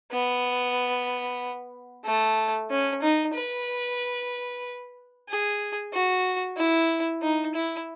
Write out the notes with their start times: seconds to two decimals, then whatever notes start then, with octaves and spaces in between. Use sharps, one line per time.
0.12 B3
2.05 A3
2.70 C#4
3.02 D#4
3.34 B4
5.29 G#4
5.93 F#4
6.57 E4
7.22 D#4
7.55 E4